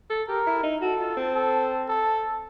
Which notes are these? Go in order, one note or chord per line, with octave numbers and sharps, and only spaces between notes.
A4
G4 A#4
E4
D#4
F#4 A4
F4
C4
A4
A4